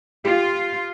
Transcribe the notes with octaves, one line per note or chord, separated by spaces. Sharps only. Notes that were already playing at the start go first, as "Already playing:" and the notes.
F4 G4